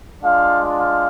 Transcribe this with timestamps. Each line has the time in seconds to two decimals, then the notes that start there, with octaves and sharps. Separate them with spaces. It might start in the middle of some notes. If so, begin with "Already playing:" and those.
0.23 G#3 D4 F4 F5
0.79 F5